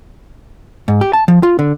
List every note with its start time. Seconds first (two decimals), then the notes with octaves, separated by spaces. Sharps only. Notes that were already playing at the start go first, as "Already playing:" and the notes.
0.88 G#2
1.01 G4
1.13 A5
1.28 F3
1.43 F4
1.59 D3